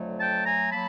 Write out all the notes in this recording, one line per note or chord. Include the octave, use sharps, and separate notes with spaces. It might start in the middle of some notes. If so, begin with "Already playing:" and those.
Already playing: F2 D3 F#3 A3
G5 A5
G#5 A#5
F#3 A#3 A5 B5